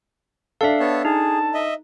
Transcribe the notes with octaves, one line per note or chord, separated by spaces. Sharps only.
D4 A4 E5 F5
B3 C#5 A5
D#4 G#4 A5
D#5 E5